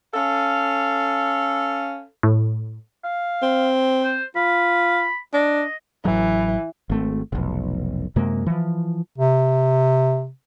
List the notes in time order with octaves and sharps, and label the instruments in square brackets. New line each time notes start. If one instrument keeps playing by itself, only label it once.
[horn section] C#4 A4 F5
[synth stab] A2
[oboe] F5
[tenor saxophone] C4
[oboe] C5
[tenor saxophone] F4 [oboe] B5
[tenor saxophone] D4 [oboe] D#5
[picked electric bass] A1 A2 F#3 [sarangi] E3
[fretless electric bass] G#1 A3 C4
F1 B1
F#2 C3 G#3 A#3
E3 F3
[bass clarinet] C3